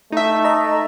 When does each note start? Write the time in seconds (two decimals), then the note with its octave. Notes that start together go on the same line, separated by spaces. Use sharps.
0.12 A3 D#4 E5
0.44 D#5 A#5